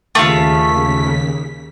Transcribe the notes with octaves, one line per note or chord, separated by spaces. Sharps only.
D#2 C#3 A3 F4 B6